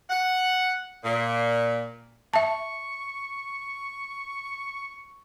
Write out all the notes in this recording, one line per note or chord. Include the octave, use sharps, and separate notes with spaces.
F#5
A#2
E5 A5 C#6